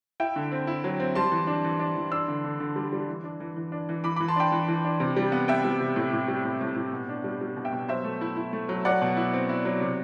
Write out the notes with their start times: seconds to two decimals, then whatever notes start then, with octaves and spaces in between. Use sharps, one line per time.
0.20 E4 E5 G5
0.36 D3
0.52 C4
0.67 E4
0.84 F#3
1.00 C4
1.15 G3 A5 C6
1.32 E3
1.47 D4
1.64 E3
1.80 D4
1.96 E3
2.11 D4 C6 E6
2.28 D3
2.44 D3
2.60 D3
2.76 G3
2.93 G3
3.08 E3
3.24 D4
3.40 E3
3.57 E3
3.72 D4
3.89 E3
4.04 E3 B5 D6
4.16 B5 D6
4.20 E3
4.28 A5 C6
4.36 D4 G5 B5
4.52 E3
4.68 E3
4.85 D4
5.00 C3
5.16 G3
5.32 B3
5.48 B3 E5 G5
5.65 G3
5.80 C3
5.96 A2
6.13 A2
6.28 G3
6.44 A2
6.61 A2
6.76 A2
6.93 B2
7.09 D4
7.24 G3
7.41 G3
7.57 B2
7.65 E5 G5
7.72 B2
7.88 F#3 C5 E5
8.04 A3
8.21 E4
8.37 E4
8.53 A3
8.69 F#3
8.85 F#3 D5 F#5
9.02 B2
9.16 E4
9.34 C4
9.49 E4
9.65 F#3
9.81 C3